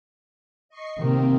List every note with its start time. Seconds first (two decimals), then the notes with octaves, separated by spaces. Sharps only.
0.69 D#5 C#6 C7
0.98 C3 D#3 A#3 C4